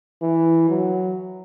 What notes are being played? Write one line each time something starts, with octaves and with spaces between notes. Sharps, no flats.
E3
F#3